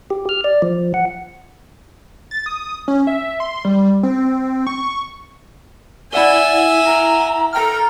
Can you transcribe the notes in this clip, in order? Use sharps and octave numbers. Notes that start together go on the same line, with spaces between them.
G4
F6
D5
F3
F#5
A6
D#6
C#4
E5
C6
G3
C4
C#6
E4 D5 E5 F#5 G#5 G7
A#5
A4 G5 A#5 F6